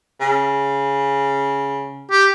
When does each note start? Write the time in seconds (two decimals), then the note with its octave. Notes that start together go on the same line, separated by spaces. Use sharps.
0.21 C#3
2.11 G4